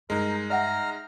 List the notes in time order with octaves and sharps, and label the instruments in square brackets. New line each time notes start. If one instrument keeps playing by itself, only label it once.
[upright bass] G2 [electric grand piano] G#3 D#4 [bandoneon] A#4
[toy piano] D#5 E5 F#5 [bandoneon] A#5 F6